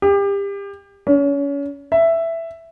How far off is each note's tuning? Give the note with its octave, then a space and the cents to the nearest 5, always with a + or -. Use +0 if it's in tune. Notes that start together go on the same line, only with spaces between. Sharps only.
G4 +30
C#4 +30
E5 +5